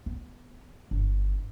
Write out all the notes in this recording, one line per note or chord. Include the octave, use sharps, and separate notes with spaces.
B3
G1